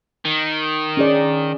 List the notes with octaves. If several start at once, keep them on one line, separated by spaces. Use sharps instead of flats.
D#3
C#4 G#4 D5